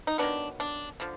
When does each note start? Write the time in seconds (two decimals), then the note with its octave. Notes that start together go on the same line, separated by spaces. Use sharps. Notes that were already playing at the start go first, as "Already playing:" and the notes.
0.07 D#4
0.18 D#3 F#3 B3 D4
0.60 D4
1.00 D3 F3